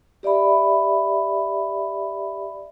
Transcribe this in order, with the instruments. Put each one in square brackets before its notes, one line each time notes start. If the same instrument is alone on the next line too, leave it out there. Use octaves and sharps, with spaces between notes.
[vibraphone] G4 D5 E5 B5